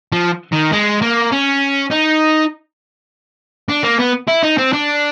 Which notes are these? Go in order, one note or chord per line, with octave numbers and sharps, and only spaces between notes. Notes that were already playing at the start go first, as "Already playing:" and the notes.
F3
D#3
G#3
A#3
C#4
D#4
D4
A#3
B3
E4
D#4
C4
D4